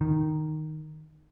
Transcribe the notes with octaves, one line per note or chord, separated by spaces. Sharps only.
D#3